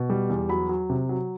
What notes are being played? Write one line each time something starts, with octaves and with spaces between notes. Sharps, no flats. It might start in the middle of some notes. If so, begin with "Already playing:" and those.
Already playing: B2
G3
E2
F#3 B5
F#3
C3
F#3